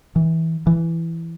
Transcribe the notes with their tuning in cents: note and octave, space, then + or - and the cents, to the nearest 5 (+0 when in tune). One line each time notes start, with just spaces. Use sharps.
E3 -20
E3 +10